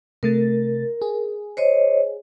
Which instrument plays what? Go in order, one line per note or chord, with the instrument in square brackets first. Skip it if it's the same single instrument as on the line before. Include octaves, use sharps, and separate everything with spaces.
[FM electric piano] C3 A3 A6 [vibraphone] A#4
[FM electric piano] G#4
[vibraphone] C5 C#5 D#5